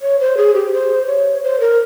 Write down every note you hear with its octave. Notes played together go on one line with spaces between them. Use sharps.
C#5
C5
G#4
G4
C5
C#5
C5
A#4